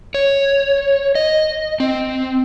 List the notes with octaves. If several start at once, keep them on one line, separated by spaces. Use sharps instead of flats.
C#5
D#5
C4